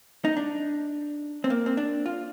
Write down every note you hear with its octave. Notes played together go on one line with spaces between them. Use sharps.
D#4
D4
C4
A#3
C4
D4
F4